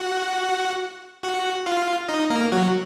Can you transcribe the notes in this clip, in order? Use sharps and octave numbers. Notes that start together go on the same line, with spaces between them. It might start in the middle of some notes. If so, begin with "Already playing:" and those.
Already playing: F#4 F#5
F#4 F#5
F4 F5
D#4 D#5
A#3 A#4
F#3 F#4